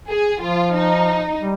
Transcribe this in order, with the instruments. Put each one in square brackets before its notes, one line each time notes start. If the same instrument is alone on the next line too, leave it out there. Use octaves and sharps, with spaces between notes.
[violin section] G#4
[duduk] F3 [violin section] F4
[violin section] D#4
[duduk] G3